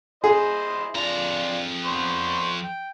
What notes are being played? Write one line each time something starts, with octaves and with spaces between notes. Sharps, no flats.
E4 G#4 C5 D#5
F2 D4 F4 A#5
B3 C5 C#6
G5